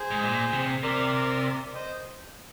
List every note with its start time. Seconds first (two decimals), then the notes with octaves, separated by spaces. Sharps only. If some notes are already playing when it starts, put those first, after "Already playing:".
Already playing: G#4 C5
0.11 G#2
0.22 A#2
0.53 C3
0.83 C3 A#4 D5
1.74 C5 D#5